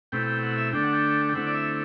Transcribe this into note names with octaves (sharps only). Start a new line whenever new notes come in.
B2 A3 C4 E4 G5
G5
F#5
E5
D3 A3 D4 G5
F#5
G5
G5
D3 A3 C4 E4 F#5
D5
E5